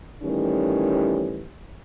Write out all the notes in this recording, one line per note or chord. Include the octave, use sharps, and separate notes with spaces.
A2 D#3 E3 G3 C#4 G4